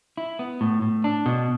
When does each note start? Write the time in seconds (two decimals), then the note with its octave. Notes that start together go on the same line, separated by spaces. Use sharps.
0.17 E4
0.39 B3
0.61 A2
0.82 A2
1.04 D4
1.26 B2